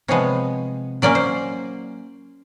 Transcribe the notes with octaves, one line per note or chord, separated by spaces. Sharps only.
C3 F3 G#3 B3 C#5
F#3 A#3 C#4 D5
C5